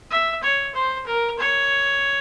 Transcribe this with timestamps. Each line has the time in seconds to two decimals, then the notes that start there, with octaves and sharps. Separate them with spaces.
0.11 E5
0.43 C#5
0.74 C5
1.07 A#4
1.39 C#5